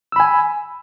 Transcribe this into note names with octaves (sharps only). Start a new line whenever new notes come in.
G#5 B5 E6